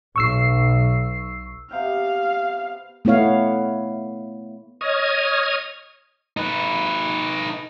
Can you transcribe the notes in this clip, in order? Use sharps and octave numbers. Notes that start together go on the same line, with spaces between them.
B1 C#6 E6 C7
C3 B3 F5 G5
A3 B3 E4 C#5 F5
C#5 D#5 D#6 F6 G#6
D#4 B4